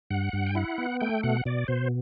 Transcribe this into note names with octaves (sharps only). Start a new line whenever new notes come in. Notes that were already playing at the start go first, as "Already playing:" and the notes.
G2 F#5
G2
G5
E4 F#5
B3
A3 G5
B2 F#5
B2 D5
B2 C5